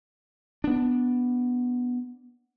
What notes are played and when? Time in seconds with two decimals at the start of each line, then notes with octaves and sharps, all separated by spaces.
0.64 B3 D4